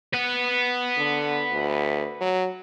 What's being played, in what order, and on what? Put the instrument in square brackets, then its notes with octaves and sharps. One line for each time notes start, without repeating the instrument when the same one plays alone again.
[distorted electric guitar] B4 F#5
[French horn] D3
D2
F#3